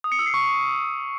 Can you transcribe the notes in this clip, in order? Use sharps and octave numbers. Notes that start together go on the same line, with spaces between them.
D#6
C#7
E6
C7
C#6